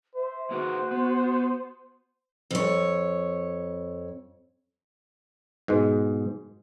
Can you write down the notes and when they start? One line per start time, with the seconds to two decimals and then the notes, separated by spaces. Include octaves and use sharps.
0.16 C5 E5
0.51 A#3 F#4 G#4 B4
0.91 B3
2.51 F2 C#5
5.68 G#2 B2 G#3